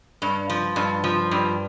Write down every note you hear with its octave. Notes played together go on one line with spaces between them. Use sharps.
G2
F3
G2
F3
G2